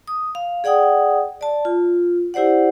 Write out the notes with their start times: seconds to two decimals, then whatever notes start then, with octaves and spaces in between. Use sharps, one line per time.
0.07 D#6
0.35 F5
0.64 G#4 D5 F#5 G5 D#6
1.41 D5 A5
1.65 F4
2.34 E4 G4 C5 D5 F#5